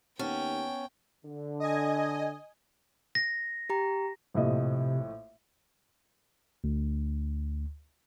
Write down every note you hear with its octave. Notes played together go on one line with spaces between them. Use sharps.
D#2 B3 C#4 F#5 G5 A5
D3
D#5 G#5
A#6
G4 A#5
A#1 A2 C3 D#5
D2